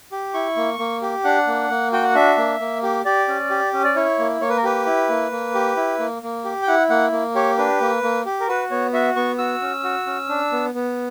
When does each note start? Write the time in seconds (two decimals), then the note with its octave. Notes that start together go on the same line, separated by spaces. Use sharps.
0.12 G4
0.34 E4 C#6
0.56 A#3
0.79 A#3
1.02 G4
1.24 D4 F#5
1.47 A#3
1.70 A#3
1.92 F#4 G5
2.04 F#5
2.15 D4 E5
2.38 A#3
2.60 A#3
2.83 G4
3.05 G4 D5
3.28 C#4
3.50 G4
3.73 C#4
3.84 D5
3.96 E4 C#5
4.19 A#3
4.41 A#3 C#5
4.49 B4
4.57 A#4
4.63 G4 B4
4.86 E4
5.09 A#3
5.32 A#3
5.54 G4
5.77 E4
5.99 A#3
6.23 A#3
6.45 G4
6.63 G5
6.67 E4 F#5
6.90 A#3 F#5
7.12 A#3
7.35 G4 C#5
7.58 D4 B4
7.81 A#3
8.03 A#3
8.25 G4
8.40 A#4
8.48 F#4 B4
8.71 B3 C#5
8.93 F#4 E5
9.16 B3 C#6
9.38 F#4 E6
9.62 C#4
9.84 F#4
10.07 C#4
10.29 D4
10.52 B3
10.74 B3